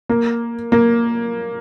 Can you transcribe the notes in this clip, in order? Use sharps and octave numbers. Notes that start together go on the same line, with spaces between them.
A#3
A#3